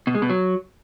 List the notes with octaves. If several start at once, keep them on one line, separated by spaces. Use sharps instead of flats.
B2
G#3
B2
F#3